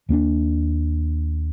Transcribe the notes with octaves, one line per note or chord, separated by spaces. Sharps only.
D#2 A#3 C4 D4